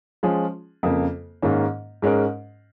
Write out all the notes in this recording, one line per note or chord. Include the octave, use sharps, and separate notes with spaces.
F3 G#3 C#4 F4 G#4
F2 C#3 A#3
G#2 D#3 A#3 C#4
G#2 G#3 C#4 A#4